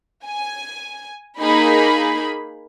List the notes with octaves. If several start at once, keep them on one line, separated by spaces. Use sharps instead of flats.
G#5
A#3 D#4 G#4 B5